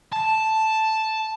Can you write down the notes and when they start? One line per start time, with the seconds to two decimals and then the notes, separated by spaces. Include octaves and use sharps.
0.13 A5